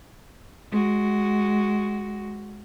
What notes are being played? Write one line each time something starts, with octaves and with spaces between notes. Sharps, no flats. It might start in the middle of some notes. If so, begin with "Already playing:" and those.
G#3 F#4